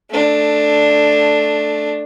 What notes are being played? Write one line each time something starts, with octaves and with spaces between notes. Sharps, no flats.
A3 D4